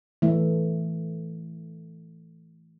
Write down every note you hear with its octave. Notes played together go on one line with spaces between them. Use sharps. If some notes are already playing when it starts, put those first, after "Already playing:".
E3 A3